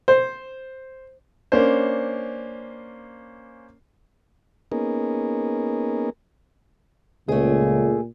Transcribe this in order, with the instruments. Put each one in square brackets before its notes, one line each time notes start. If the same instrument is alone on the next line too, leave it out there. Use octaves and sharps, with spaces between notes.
[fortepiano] C5
[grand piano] A#3 C#4 D4 C5
[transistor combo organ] A#3 B3 C#4 D#4 G#4 A#4
[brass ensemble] C#2 [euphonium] A#2 [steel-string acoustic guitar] A3 G#4